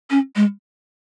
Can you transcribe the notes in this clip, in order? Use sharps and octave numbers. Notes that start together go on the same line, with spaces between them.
C#4
G#3